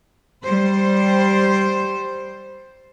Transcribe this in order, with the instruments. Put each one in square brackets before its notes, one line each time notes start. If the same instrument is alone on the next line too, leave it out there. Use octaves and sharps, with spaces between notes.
[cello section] G3 C5